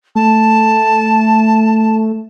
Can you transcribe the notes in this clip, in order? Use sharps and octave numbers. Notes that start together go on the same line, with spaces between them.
A3 A5